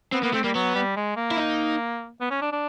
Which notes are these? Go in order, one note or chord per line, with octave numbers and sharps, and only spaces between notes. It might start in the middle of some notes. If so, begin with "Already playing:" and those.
B3 C4
A#3 B3
A3 C4
G3 A#3
F#3 B3
G3
G#3
A#3
E4
D#4
B3
C#4
D4
D4